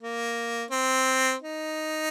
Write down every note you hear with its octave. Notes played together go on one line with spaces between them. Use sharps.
A#3
C4
D#4